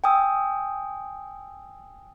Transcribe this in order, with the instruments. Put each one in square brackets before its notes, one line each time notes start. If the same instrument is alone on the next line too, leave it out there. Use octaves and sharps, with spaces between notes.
[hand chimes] G5 G#5 D#6 E6